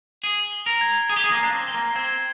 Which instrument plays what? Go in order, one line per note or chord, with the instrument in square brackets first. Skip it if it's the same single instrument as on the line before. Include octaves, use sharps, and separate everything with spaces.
[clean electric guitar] G#4 [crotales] C7
[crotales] G7
[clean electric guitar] A#4
[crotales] G#6
[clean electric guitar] G#4 [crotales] G#6
[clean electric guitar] G4
G#4
A#3
[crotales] C7
[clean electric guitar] D4
C4
[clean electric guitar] C4 [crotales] G7
[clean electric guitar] A#3
[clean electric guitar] C4 [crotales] G#6